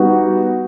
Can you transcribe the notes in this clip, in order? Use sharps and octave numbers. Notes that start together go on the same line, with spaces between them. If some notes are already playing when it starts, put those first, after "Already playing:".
Already playing: G3 B3 D#4 F#4